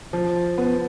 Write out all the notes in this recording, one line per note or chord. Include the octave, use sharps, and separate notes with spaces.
F3
B3